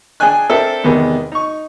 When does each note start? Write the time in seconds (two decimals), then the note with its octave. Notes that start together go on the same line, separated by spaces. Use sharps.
0.20 D4 G#4 G5 G#5 F#6
0.49 C4 D4 A4 A#4 E5 G5
0.84 E2 C3 D#3 G#3 B3
1.32 D#4 C#6